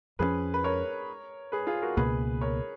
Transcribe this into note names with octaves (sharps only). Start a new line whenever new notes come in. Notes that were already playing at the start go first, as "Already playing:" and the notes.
F2 F3 A#3 C#4 G#4 B4
B4
A#4 C#5
G#4 B4
F4 G#4
F#4 A#4
C#2 B2 A#3 G#4 B4
A#4 C#5